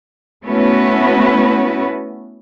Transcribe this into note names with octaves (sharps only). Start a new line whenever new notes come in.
A3 B3 C#4 E4 F#4 B4